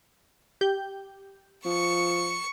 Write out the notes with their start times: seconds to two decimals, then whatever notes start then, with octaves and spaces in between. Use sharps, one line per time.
0.61 G4 G6
1.66 F3 C#6 C#7